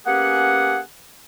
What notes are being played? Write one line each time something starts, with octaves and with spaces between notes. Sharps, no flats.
A#3 B3 C#4 G4 G#4 F#5